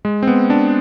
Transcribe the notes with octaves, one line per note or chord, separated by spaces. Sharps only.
G#3
C4
B3
D4